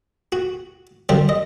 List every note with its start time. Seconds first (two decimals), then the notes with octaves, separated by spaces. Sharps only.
0.32 F#4
1.09 F#2 D3 G3 C5
1.29 D#5